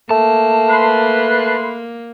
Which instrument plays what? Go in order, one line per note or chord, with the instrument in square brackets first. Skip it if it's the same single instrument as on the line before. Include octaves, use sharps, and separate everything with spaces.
[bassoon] A3 [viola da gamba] A#3 [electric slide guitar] A5
[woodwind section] B4 C6